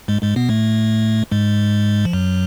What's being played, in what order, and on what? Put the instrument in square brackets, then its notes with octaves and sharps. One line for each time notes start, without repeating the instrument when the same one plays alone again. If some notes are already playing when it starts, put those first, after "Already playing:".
[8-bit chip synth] G#2 G#3
G#2 G#3
B2 B3
A2 A3
G#2 G#3
F3
F#2 F#3